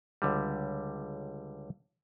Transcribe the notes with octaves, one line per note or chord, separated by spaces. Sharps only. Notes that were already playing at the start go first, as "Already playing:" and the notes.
C#2 D3 G3